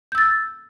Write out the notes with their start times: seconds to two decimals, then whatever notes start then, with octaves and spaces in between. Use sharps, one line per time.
0.12 G6
0.15 E6
0.18 A6